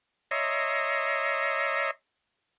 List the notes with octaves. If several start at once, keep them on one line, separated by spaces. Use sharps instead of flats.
C#5 D#5 E5 A#5 C6